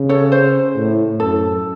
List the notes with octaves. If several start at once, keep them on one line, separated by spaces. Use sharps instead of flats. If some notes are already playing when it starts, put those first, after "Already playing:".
Already playing: C#3
A4 C#5
C5
A2
F#2 A4